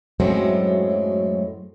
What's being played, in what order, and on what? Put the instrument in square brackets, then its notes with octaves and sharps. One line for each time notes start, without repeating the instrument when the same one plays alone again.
[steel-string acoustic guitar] F#2 A2 F#3 G#3 A3 C4